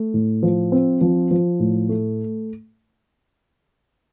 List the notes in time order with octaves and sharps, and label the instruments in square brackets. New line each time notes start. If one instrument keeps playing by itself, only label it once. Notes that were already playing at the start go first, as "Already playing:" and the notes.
Already playing: [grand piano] A3
A2
F3
C4
F3
F3
A2
A3